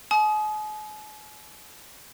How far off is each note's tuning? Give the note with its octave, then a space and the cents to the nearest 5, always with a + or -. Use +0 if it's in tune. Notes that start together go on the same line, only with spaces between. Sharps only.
G#5 +45 D#6 +0